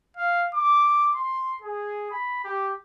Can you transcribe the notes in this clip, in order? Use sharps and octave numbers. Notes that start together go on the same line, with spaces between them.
F5
D6
C6
G#4
B5
G4